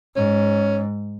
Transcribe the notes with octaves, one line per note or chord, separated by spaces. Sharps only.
G#2 C#4